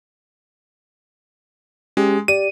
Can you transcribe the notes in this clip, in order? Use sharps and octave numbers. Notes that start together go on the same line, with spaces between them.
G#3 C#4 G4
G4 D5 D#7